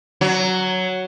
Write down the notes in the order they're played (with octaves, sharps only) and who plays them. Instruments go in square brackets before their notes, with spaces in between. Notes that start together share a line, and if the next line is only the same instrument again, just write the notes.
[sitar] F#3